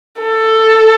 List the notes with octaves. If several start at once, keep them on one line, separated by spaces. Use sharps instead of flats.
A4